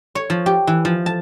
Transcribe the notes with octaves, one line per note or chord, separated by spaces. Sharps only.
C#5
F3
G4
E3
F3
A5